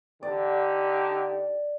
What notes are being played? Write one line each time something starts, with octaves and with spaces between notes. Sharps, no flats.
D3 D#4 G4 D5